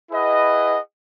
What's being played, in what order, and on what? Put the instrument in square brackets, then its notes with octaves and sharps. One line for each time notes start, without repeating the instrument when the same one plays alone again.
[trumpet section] E4 G#4 B4 D#5 F#5